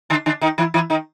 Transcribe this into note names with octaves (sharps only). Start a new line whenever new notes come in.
D3 D4
D3 D4
D#3 D#4
E3 E4
E3 E4
D#3 D#4